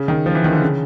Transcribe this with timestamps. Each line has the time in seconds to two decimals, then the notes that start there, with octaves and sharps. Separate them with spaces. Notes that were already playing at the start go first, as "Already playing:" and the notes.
Already playing: C#3
0.08 D#3
0.26 F3
0.35 E3
0.44 D#3
0.53 D3
0.62 C#3